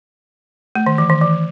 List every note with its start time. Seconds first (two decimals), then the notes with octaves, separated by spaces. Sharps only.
0.75 A3
0.86 D#3
0.98 E3
1.10 D#3
1.21 E3